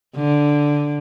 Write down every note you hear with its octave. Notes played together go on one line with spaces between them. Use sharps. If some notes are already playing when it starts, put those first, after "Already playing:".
D3